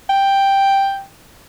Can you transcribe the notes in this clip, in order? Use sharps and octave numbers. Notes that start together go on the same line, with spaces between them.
G5